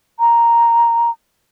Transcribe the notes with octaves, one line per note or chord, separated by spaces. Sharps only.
A#5